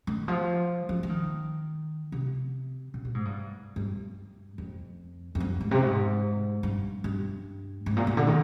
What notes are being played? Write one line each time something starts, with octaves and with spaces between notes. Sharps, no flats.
D#3
F3
F3
F3
D#3
C3
A#2
A#2
G#2
G2
G2
F2
F2
G2
G#2
C3
G#2
G2
G2
G#2
A#2
A#2
D3
D#3